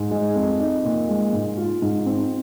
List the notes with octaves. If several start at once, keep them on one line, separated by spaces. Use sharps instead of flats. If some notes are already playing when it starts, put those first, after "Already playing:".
Already playing: G#2
G#3
F2
D#4
A#2
G#3
G#2
F4
G#2
C4